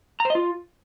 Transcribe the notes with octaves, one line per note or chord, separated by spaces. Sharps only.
A#5
C5
D#5
F4